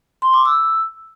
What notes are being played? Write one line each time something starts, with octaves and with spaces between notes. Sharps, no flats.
C6
D6
E6